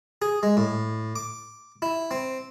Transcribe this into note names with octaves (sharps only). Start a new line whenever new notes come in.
G#4
G#3
A2
D6
E4
C4